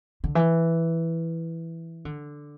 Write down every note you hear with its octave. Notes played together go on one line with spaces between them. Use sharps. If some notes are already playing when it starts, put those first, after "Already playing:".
D3
E3
D3